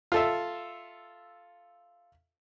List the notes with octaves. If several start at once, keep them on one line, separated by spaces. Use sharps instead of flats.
F4 A4 E5